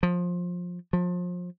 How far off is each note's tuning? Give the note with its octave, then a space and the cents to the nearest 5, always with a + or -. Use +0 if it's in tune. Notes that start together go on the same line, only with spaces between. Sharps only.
F3 +20
F3 +30